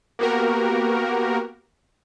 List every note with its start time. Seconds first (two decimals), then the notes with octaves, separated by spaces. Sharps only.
0.19 A#3 B3 F#4 G4 A#4